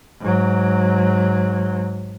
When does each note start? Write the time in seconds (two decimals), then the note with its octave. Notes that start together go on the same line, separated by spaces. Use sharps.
0.20 G#2 F#3